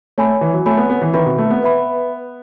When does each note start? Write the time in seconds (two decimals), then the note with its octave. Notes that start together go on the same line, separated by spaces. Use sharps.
0.18 A3 C#5 G#5 B5
0.41 E3
0.54 F#3
0.66 A3 C#5 G#5 B5
0.78 B3
0.90 B3
1.01 E3
1.14 D#3 B4 E5 B5
1.26 B2
1.38 A3
1.50 B3
1.62 B4 E5 B5